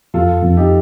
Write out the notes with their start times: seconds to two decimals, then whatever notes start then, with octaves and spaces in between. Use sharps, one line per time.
0.14 F2 F4 A4
0.42 F2
0.57 D#4 G4